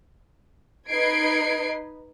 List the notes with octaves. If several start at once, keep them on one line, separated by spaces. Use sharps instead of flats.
D#4 B4 D#5 G#6 C7 D7